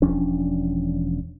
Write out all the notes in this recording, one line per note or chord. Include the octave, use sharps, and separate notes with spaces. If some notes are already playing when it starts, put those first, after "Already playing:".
E1 F3 C#4 D4